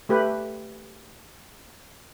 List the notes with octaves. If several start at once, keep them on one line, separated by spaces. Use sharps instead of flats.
A3 G4 B4